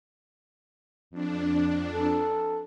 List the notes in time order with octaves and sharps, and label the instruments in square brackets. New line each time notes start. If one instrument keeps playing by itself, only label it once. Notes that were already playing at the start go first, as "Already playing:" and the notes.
[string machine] F2 D4
[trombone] A4